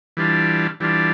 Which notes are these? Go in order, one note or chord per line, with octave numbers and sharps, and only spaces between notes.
E3 G3 D4 F4
E3 G3 D4 F4